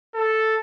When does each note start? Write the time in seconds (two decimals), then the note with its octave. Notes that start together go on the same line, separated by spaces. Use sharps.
0.14 A4